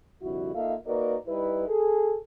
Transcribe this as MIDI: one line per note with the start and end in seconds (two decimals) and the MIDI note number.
0.22 0.54 36
0.22 0.54 41
0.22 0.54 50
0.22 0.54 64
0.22 0.54 66
0.55 0.74 58
0.55 0.74 63
0.55 0.74 65
0.55 0.74 69
0.55 0.74 76
0.55 0.74 77
0.86 1.16 58
0.86 1.16 63
0.86 1.16 66
0.86 1.16 70
0.86 1.16 71
0.86 1.16 74
1.28 1.65 55
1.28 1.65 63
1.28 1.65 64
1.28 1.65 71
1.68 2.16 68
1.68 2.16 69